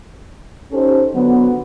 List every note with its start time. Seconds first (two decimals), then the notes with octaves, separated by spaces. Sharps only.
0.72 C#4 D#4 G4 A4 C5
1.13 D3 F#3 B3